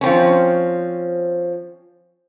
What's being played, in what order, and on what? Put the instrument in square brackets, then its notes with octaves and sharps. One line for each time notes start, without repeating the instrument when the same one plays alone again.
[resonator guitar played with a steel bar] F3 C4 C#4